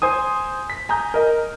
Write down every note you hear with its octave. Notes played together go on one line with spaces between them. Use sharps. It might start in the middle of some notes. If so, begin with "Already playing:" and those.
C5 G#5 D#6
B6
G#5 A#5 D#6 G6
A#4 D#5 A#5